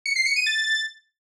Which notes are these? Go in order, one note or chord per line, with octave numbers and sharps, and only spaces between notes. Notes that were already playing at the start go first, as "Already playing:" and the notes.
C#7
C7
C#7
D#7
A6